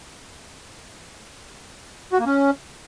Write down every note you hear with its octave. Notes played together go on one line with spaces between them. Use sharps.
F#4
A#3
C#4